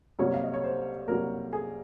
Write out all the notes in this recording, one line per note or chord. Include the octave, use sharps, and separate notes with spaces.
C2 C3 F#3 A#3 C#5
F5
D#5
C#5
C5
C2 C3 F#3 A#3 A#4
G#4